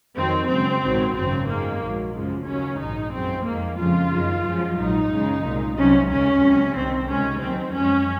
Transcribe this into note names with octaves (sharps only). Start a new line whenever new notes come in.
F2 D#3 F#3 C4
F#2 C#3 G#3 C4
A#1 G#2 D#3 F#3
G#1 F#2 C#3 F#3 C4
F#2 D#3 G#3 A#3
A#1 G#2 F#3
F#2 C#3 F3 G#3
D#2 C#3 F#3 C#4
A#1 G#2 D#3 G#3 D#4
F#2 F3 G#3 C4
F2 D#3 G#3 A#3
F2 C#3 F3 G#3 F4
F#2 D#3 G#3
F#2 F3 G#3
A#1 G#2 F#3 D#4
F#2 C#3 G#3
C2 A#2 G#3
C2 C3 F#3 C#4
D#2 C#3 G#3 C#4
C#2 C3 F#3
C2 C3 D#3 C4
C#2 C3 D#3 G#3 C#4
D#2 D#3 F#3 C4
F#2 F3 G#3 C#4